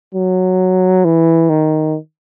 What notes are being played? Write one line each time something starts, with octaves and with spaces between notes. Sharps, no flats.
F#3
E3
D#3